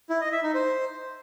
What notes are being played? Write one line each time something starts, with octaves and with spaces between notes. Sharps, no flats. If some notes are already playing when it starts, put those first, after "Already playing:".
E4
D#5
E5
D#4
C5